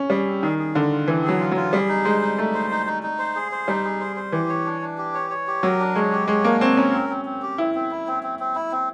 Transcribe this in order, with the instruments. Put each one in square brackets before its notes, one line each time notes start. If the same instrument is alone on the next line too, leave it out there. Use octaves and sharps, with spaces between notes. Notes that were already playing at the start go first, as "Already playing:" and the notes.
Already playing: [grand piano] C#4
[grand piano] G3 [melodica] G#4
[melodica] C4
[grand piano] D#3 [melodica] G#4
[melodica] G#4
[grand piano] D3 [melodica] F4
[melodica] F4
[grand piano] E3 [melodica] C4
[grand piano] F#3 [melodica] G#4
[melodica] F4
[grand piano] F#3 [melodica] F4
[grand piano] G3 [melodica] G#4
[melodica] D#4
[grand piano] G#3 [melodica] C5
[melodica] D#4
[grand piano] A3 [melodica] D#4
[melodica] C5
D#4
D#4
D#4
C5
G#4
C5
[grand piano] G3 [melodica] D#4
[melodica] G#4
C5
C5
[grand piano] E3 [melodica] G4
[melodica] C#5
D4
D4
G4
C#5
C#5
G4
[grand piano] F#3 [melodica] A#4
[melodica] D4
[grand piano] G#3 [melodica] C#5
[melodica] G4
[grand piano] G#3 [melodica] C#5
[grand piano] A#3 [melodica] D4
[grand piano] C4 [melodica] C#5
[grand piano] C#4 [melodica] A#4
[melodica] C4
C4
C4
G4
[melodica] C4 [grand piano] E4
[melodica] C4
E4
C4
C4
C4
E4
C4